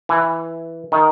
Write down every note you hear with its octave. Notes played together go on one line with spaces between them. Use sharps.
E3
D#3